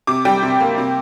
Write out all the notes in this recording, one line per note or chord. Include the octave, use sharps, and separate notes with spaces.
C3 D6
G3 G5
C3
A#3
C3